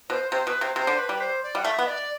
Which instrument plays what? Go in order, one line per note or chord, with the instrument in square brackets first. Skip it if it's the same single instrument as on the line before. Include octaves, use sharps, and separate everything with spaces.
[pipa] B2 [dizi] C5
[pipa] C3 [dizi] C5
[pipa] B2 [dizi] B4
[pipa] C3 [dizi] C5
[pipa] C3 [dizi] C5
[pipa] D3
[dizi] B4
[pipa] G3
[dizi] C5
D5
[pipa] G3 [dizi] F#5
[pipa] A3 [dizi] E5
[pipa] B3
[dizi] D5